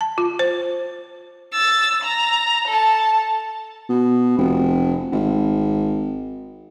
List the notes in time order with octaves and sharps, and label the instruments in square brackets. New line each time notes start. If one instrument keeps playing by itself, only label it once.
[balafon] A5
F4
C5
[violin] E6 A6
A#5
A4 A5
[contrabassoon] B2
F1
G#1